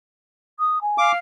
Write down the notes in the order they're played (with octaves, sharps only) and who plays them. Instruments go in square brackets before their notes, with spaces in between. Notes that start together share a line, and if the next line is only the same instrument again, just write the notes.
[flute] D#6
G#5
[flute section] F5 [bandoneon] D6